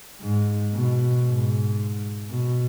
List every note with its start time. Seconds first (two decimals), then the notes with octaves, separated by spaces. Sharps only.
0.21 G#2
0.74 B2
1.26 G#2
2.30 B2